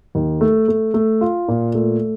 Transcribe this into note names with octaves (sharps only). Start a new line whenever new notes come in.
D#2
A3
A3
A3
F4
A#2
A3